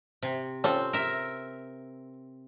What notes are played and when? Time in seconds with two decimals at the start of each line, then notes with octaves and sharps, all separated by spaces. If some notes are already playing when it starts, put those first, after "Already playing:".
0.22 C3
0.64 C4 C#4 F4 A4
0.93 A#4 E5